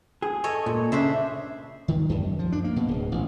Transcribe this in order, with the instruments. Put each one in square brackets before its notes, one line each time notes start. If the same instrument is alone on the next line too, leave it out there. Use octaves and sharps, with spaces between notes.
[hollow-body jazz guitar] G#4
[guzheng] A4 C#5 D#5
[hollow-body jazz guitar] A#2
[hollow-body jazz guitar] C#3 [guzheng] D4 C5 E5
[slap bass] D#3
F#2
F3
D4
A#3
B2
D1
A1